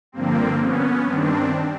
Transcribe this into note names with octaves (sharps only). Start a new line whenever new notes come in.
G2 D3 F3 A#3 C4
B3 C#4
G2 D#3 C4 D4